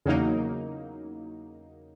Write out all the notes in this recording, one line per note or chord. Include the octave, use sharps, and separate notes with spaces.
E2 C#3 F#3 A#3 D#4